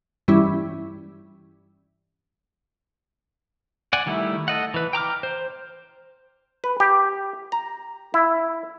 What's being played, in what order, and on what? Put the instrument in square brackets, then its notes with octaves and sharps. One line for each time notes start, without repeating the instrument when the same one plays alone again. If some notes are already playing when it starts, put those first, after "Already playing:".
[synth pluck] G2 E3 G3 C#4 E4
[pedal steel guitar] D5 F#5 G#5
D#3 G3 A3 E4
A4 D#5 F#5
E3 B4
G5 A#5 D6 F6
C5
[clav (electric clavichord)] B4
G4
A#5
E4